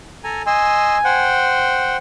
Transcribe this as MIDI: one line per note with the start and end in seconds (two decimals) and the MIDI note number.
0.24 0.42 69
0.24 0.42 80
0.24 0.42 82
0.47 0.97 75
0.47 1.41 80
0.47 0.97 84
0.47 0.97 88
1.05 1.97 72
1.05 1.97 78
1.05 1.97 79